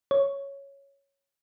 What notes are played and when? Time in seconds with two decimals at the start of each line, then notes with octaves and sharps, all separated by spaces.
0.11 C#5